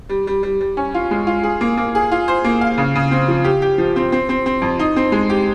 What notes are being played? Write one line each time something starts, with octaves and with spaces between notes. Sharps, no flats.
G3
G3
G3
G3
C#4
F4
G#3
F4
G#4
A#3
A#3
G#4
F4
C5
A#3
F5
C#3
C#3
C4
F3
G4
G4
F3
C4
C4
C4
C4
F2
D#4
C4
G#3
G4